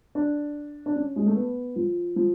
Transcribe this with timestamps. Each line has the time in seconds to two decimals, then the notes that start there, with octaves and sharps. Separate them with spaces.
0.15 D4
0.86 D4
0.96 C#4
1.16 G#3
1.26 A3
1.36 B3
1.76 F3
2.16 F3